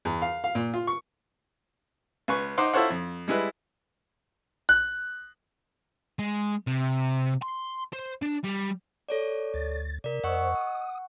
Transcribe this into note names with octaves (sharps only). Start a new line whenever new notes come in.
E2
F5
F5
A#2
F4
C#6
C#2 B4 C#6
D#4 C5 F#5 C6 D6
E4 F4 A4 C5 C#5 F#5
F2
G3 G#3 E4 B4
F#6
G#3
C3
C6
C5
D4
G3
A4 C#5 D5
D2 A6
C3 A#4 D5
F2 C5 D#5 F#5 C#6 E6
D#6